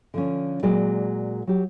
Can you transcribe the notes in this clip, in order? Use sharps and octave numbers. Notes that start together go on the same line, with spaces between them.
D3 F3 C#4
A#2 F#3 G#3 G#4 D5
F#3 G4